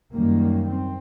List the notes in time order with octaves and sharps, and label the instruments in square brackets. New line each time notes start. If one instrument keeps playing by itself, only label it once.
[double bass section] F#2 D#3 G3 A#3
C4